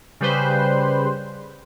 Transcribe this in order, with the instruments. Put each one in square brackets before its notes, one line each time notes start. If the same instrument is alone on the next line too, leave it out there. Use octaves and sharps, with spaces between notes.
[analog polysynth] C#3 G3 B4 C5